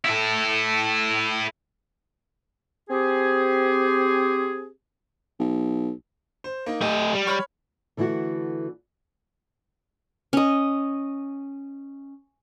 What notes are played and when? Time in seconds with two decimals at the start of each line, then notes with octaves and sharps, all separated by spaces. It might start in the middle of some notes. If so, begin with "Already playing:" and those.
0.05 E4 A4
2.89 C4 G4 G#4
5.39 B1
6.44 C5
6.66 A#3 D#4
6.81 A3 G4 D#5
7.14 G3
7.27 C#5 B5 F6
7.97 D3 E3 A3 E4 F#4
10.33 C#4 D#5